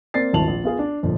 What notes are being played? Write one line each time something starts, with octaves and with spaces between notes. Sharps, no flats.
A#3 C4 D5 A6 C7
D#1 G#1 E4 A5 F7 F#7
A#1
B3 F4 G#4 F5
D4
G1 F2 A#2 F3